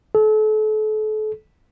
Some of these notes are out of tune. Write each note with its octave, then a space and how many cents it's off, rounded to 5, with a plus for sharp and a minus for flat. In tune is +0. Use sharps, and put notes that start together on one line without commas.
A4 -35